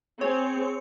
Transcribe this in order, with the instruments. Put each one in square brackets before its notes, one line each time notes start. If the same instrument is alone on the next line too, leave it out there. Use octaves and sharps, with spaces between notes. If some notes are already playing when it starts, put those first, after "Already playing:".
[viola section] C4 G#4 [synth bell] C#5